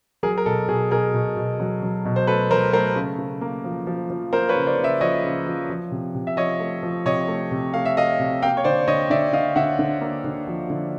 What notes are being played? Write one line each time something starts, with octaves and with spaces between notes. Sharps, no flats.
F#3 G#4 A#4
A#4
B2 A4
B2 G#4
B2 G#4 A#4
B2
B2
F#3
F#3
B2
C5
A3 A4 B4
F#3 A#4 C5
A3 A#4 C5
C#3
C#3
A#3
F3
F3
F3
A#3 A#4 C5
B4 C#5
C#3
C5 D5
C#3
D5 E5
F3 C#5 D#5
C#3
F3
F3
C3
C3
E5
F3 C#5 D#5
A3
F3
C3 C#5 D#5
A3
C3
A3 F5
E5
A3 D#5 F5
C3
A#3 F5 G5
C#5
D3 C5 D5
D3 C#5 D#5
D3 D5 E5
D3 D#5 F5
D3 E5 F#5
D3
A#3
D3
F3
D3